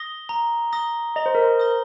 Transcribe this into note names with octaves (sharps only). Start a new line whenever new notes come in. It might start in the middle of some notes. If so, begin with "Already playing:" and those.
Already playing: D#6 A#6 G7
A#5
D#6 A#6 G7
D#5 A#5
C5
A#4
C5
D#6 A#6 G7